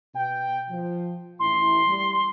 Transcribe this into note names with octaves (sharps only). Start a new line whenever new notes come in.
B2 G5
F3
A1 E4 C6
G3